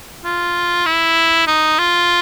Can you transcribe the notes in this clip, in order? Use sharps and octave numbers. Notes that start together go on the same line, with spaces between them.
F4
E4
D#4
F4